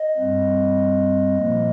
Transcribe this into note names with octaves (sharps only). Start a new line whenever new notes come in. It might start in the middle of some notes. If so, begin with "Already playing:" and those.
Already playing: D#5
G2 G3 C4
A#2 F3 A#3